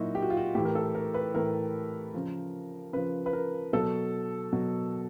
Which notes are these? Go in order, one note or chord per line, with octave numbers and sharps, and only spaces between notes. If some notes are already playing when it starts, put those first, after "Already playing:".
Already playing: A#2 F#3 D#4 E4 F#4
G4
F#4
F4
F#4
A2 E3 G4
A#4
A4
A#4
B4
A2 E3 A#4
C#3 F3
C#3 F3 B4
B4
A#4
B2 F#3 A4
B2 F#3